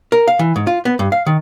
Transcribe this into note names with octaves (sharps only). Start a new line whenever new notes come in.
A#4
F5
E3
G#2
F4
B3
G2
F5
D#3